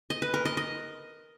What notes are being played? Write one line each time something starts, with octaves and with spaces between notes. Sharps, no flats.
D#5
B4
A#4
D#5
D#5